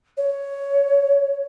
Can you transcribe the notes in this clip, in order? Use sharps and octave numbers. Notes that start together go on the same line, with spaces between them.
C#5